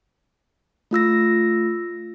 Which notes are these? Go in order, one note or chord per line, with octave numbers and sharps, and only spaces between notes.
A3 F4 E6 A#6